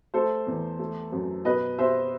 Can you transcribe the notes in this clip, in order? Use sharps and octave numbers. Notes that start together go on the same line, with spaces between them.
A3 A4 C5
E2
A3
F#2
B2 B4 D#5
B2 C5 E5